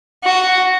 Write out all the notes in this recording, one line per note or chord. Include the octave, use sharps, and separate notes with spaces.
F#4